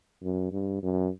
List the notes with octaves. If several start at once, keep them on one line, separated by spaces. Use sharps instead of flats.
F#2
G2
F#2